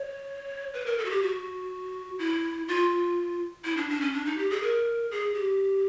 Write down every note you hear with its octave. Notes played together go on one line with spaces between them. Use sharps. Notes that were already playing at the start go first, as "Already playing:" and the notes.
Already playing: C#5
B4
A#4
A4
F#4
G4
F#4
E4
F4
E4
D4
D4
C#4
D4
D#4
G4
G#4
A#4
G#4
G4